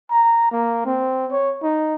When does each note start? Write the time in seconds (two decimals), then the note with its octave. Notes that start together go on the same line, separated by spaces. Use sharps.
0.11 A#5
0.51 A#3
0.86 C4
1.31 C#5
1.63 D#4